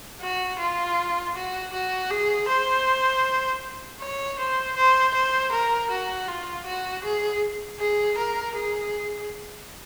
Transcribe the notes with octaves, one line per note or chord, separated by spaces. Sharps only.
F#4
F4
F#4
F#4
G#4
C5
C#5
C5
C5
C5
A#4
F#4
F4
F#4
G#4
G#4
A#4
G#4